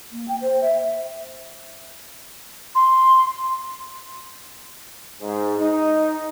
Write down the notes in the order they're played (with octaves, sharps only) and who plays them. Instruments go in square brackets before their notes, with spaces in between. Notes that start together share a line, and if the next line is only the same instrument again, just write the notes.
[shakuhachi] A#3
G5
C5
E5
[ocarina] C6
[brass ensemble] G#2
D#4